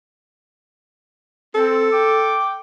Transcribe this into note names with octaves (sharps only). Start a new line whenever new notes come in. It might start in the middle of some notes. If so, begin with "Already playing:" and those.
C4 A4
G5 D6